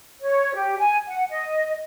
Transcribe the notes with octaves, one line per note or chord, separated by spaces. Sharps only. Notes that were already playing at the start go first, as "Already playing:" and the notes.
C#5
G4
G#5
F#5
D#5